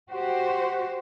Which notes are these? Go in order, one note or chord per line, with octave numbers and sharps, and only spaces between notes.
F#4 G4 C5 F#5